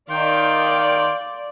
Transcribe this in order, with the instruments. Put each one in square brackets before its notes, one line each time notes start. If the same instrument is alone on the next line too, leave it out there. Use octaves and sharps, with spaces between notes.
[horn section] D#3 [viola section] D5 [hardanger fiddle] F5 C6 [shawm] G5